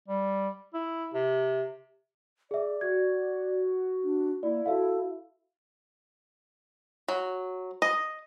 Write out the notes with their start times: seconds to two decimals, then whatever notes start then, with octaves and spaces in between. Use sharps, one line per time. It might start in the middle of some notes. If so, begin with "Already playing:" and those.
0.08 G3
0.74 E4
1.14 C3
2.51 G#4 D5 E5
2.81 F#4 G#6
4.04 D4
4.43 A#3 E4 D5
4.66 F#4 A4 E5 F5
7.08 F#3
7.82 D#5